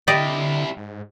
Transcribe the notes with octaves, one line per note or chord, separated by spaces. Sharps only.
D3 G3 E4 G4 D5 D#5
G#2